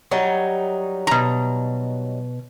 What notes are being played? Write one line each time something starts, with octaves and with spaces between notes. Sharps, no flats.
F#3 G3 D#4
B2 A#5